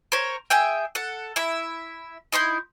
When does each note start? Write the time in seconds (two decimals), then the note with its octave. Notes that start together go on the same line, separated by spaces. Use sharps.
0.12 A#4 C5 C#5
0.50 G#4 E5 G5
0.95 A4 F#5
1.36 E4 E5
2.32 D#4 E4 C6 G6